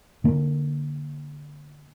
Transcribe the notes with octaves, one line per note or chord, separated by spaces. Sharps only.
D3 A#3